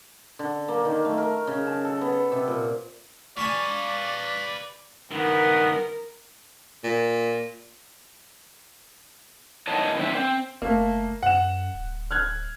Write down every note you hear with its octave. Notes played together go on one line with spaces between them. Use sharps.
D3
A#3
D#3
A3
A#4
C#3
A5
A4
B3
C3
A#2
B4 D5 F5 G#5 A5 C#6
G2 D#3 B3 A#4
A#2
E2 D#3 E4 C#5 D#5 A5
D#3 C4 D4 C5 E5
C4
F#1 A3 A#3
F#2 F#5 E7
D1
F6 F#6 G#6